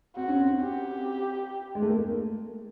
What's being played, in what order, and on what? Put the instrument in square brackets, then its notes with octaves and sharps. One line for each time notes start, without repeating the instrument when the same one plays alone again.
[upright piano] C4 [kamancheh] F#4
[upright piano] C#4
C4
[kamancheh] G4
[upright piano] G#3
A3
A#3